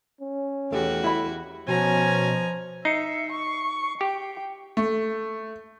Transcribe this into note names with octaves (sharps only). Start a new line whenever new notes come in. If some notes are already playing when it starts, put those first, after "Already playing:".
C#4
E2 A3 F#4 G4
E4 B5
B2 F3 C#4 G#5 A#5
D#4 E5 C7 C#7
C#6
G4 G5
A3